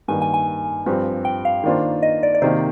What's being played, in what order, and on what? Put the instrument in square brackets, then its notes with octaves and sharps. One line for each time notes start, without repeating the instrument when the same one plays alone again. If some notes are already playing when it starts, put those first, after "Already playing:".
[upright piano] G2 D#3 A#3 [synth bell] G#5
[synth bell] G#5
G#5
[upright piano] G2 F3 C4 G4
[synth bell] G5
F5
[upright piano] D#3 A#3 D4 F4 C5
[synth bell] D#5
D5
D5
[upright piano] C3 D#3 A#3 [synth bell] C5